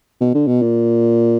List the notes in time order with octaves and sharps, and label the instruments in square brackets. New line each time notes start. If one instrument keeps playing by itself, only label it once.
[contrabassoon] B2
D3
B2
A#2